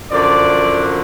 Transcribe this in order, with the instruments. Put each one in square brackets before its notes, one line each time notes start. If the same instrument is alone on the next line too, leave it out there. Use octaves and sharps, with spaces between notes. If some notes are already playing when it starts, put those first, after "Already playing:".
[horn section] F#2 D3 F3 D5